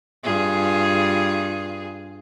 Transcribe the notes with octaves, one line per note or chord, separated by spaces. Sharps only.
G2 F4 G#4